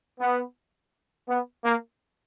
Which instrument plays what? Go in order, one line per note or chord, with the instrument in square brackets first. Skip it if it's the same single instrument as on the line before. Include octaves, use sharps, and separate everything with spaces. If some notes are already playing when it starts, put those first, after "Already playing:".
[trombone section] B3
B3
A#3